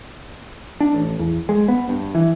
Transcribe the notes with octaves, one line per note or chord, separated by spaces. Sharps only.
D4
A1
E2
G#3
B3
G2
E3